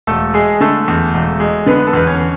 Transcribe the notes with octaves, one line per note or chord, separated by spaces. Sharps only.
E1 A3 A4
G#3 G#4
D3 A3 A4
E2
E1
G#3
D3 B3 B4
A4
E2 B4
C#4 C#5